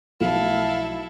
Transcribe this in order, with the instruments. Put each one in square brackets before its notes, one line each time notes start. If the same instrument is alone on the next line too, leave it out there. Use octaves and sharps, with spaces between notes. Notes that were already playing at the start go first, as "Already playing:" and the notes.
[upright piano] B1 [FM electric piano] F3 F#3 A3 [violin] E4 A4 [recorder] F5